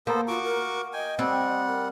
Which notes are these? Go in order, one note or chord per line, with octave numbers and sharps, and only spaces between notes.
A#3 B3 A4 C5
F4 F#4 C#6 D6
A#4
D#5 G5 G#5
G3 C4 F#5
A#4